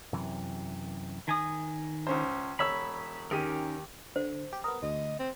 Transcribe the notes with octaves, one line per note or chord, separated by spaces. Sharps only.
F#2 C3 E3
D#3 G#5 D#6
C#2 C#4 C5
E1 C#5 B5 E6
D#2 C#4 D#4 G4 A#4 D#7
D3 C5
G4
B3 A#4 D#6
D2 D#5
C4